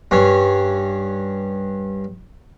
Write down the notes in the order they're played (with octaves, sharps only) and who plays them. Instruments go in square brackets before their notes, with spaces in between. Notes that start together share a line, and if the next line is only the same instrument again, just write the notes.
[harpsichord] G2 C#4